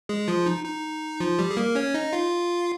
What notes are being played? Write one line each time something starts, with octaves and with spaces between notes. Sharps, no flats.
G#3 G#4
F3 F4
D#4
D#4
F3 F4
G3 G4
G#4
A#3 A#4
C#4 C#5
D#4 D#5
F4 F5